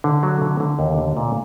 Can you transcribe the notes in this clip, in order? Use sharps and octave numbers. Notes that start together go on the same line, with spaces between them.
D3
F#3
D3
D3
D#2
D3
A#2